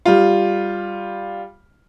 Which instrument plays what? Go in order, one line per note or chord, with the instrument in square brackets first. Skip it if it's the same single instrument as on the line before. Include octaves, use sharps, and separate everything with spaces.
[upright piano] G3 F4